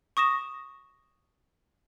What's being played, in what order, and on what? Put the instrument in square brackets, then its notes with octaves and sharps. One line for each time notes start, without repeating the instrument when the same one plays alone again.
[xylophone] C#6 D#6 A#6 E7